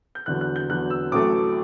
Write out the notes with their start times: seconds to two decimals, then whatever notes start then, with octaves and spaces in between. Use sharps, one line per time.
0.15 G6
0.26 E2 D3 F#3 F#6
0.41 F#6
0.56 G6
0.69 E2 D3 F#3 F#6
0.90 E6
1.12 A1 A2 F#3 A3 D6